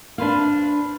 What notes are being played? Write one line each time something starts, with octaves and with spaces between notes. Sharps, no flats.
D4 B4 C5 F5